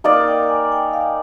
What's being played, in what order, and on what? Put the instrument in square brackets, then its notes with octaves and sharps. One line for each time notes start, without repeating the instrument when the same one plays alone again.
[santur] A#3 D#4 A#4 D5 [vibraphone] D#5
[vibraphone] G5
G#5
G5
F5